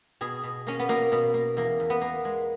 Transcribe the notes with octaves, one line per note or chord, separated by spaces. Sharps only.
B2 G#4
B2
A#3 C#4
B3
B2 A#3
B2
A#3
E2 A#3
E2
B3
A#3
G#3